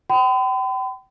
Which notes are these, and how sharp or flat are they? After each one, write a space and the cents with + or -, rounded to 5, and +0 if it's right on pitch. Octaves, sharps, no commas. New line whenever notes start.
G5 -35 B5 +45